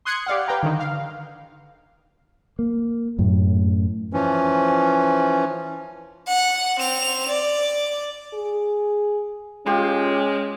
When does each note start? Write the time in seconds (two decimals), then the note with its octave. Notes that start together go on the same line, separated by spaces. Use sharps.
0.05 C6 D#6 F#6 G#6 C#7
0.27 G4 D5 F5 F#5
0.48 B4 F5 G5 A#5
0.63 D3 D#3
0.79 F5
2.59 A#3
3.19 F#2 A2
4.13 E3 F3 C#4
6.28 F#5
6.79 C4 F7
7.28 D5
8.34 G#4
9.66 G#3 C#4 F4 G4 C6